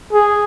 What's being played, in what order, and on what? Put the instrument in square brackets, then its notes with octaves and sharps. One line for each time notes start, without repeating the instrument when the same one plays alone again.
[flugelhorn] G#4